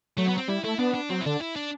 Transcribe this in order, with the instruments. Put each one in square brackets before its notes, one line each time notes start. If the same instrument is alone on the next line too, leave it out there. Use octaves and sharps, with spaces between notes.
[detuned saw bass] F#3 [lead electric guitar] A3
[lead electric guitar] B3
C4
[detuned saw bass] G3 [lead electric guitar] E4
[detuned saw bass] A3 [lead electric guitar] E4
[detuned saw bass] B3 [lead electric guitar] D4
[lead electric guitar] D4
[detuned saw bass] F#3 [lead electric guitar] C4
[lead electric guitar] E4
[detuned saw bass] D3 [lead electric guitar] D4
[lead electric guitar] E4
D4